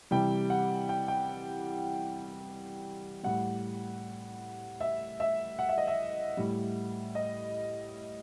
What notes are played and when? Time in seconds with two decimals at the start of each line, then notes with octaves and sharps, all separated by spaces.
0.11 C3 E3 G3 G5
0.50 F#5
0.89 G5
1.08 G5
3.23 A2 G3 F#5
4.81 E5
5.20 E5
5.59 F#5
5.69 E5
5.78 D#5
5.87 E5
6.37 A2 G3
7.15 D#5